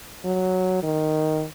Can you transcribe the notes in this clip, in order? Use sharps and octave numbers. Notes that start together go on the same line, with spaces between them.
F#3
D#3